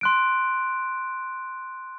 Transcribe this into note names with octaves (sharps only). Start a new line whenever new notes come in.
C6 F#6 D7